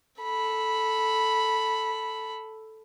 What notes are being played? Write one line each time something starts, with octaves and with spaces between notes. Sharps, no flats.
A4 B5